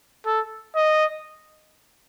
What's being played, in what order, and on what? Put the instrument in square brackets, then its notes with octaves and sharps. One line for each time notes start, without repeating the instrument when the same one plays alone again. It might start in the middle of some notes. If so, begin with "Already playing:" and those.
[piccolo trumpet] A4
D#5